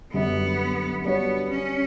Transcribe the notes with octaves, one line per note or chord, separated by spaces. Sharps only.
F#2 D3 G3 B3
G3 B3 D4 F#4 C#5
C#4